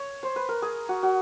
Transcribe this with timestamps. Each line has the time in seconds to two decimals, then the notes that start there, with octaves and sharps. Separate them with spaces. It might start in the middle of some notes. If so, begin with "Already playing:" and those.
Already playing: C#5
0.23 C5
0.36 B4
0.49 A#4
0.62 G#4
0.89 F#4
1.03 F#4